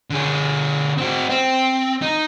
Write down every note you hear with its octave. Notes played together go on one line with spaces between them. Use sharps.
D3 G#4
C4 F#4
C4
D#4